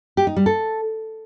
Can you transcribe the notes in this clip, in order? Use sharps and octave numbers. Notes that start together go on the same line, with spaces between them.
G4
D#4
G3
A4